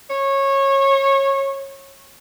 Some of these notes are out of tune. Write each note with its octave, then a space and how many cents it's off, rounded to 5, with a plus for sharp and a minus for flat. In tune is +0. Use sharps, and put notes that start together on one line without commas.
C#5 -20